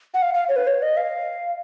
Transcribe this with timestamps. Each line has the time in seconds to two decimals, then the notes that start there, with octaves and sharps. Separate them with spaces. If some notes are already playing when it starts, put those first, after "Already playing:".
0.14 F#5
0.22 F5
0.34 F5
0.49 C#5
0.56 B4
0.67 C#5
0.82 D#5
0.97 F5